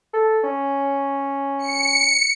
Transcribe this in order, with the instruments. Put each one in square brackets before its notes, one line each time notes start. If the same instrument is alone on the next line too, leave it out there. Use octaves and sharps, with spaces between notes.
[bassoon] A4
C#4
[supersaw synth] C#7